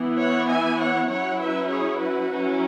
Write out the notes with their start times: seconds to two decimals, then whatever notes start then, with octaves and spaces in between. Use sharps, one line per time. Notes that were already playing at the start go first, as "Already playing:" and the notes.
Already playing: E3 B3 E4
0.19 C#5 F#5
0.49 E5 G#5
0.79 C#5 F#5
1.09 F#3 C#4 E4 C#5 F#5
1.40 B4 E5
1.69 G#4 C#5
2.00 F#4 B4
2.31 F#3 C#4 E4